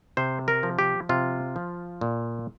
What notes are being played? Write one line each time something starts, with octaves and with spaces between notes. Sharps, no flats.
C3 C5
A#4
F3
G4
C3 F4
F3
A#2